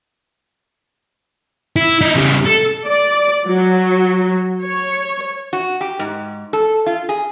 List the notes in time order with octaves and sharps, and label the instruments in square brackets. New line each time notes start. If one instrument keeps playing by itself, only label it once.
[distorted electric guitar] E4
D#4 E4
C#3 G3
A4
[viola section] D5
F#3
C#5
[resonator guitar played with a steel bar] F#4
G4
G#2
A4
F4
G#4